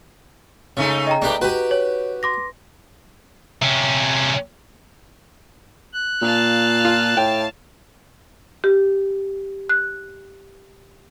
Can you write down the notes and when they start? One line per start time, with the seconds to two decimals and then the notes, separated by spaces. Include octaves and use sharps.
0.77 C#3 G#3 A3 D#4
1.07 D#5 G5 A#5
1.22 A3 D4 D#4 G4 B4
1.41 F#4 G4 B4
1.71 C#5
2.23 C6 D6 A#6
3.62 C3 C#4
5.93 F#6
6.22 A#2 F5 A5
6.85 F4
7.17 A2 G5
8.64 G4
9.69 F#6